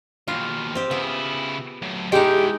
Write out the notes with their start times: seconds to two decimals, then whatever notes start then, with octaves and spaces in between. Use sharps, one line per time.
0.28 D#2 B2 F4
0.75 C4 G4
0.91 C#3 B3 E4
1.82 F#3 A3
2.12 G#3 D#4 E4 G4 G5